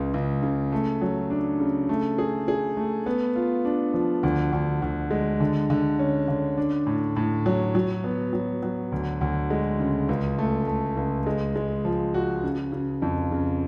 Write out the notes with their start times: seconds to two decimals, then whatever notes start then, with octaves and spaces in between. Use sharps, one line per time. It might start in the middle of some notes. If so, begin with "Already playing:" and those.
Already playing: C#2 C#3
0.14 C#2
0.43 C#3
0.72 A3
1.01 F#3
1.30 D4
1.60 C#3
1.89 A3
2.18 G#4
2.48 G#4
2.77 A3
3.06 B3
3.36 F4
3.65 D4
3.94 F3
4.23 D2
4.53 D2
4.82 D2
5.11 G#3
5.40 D3
5.70 D3
5.99 C#4
6.28 D3
6.58 D4
6.87 A2
7.16 A2
7.46 F#3
7.75 F#3
8.04 B3
8.33 F#3
8.63 F#3
8.92 D2
9.21 D2
9.50 G#3
9.79 C#3
10.09 C#2
10.38 A3
10.67 A3
10.97 C#2
11.27 G#3
11.56 G#3
11.85 F3
12.14 F#4
12.43 C#3
12.72 C#3
13.02 F2
13.31 C#3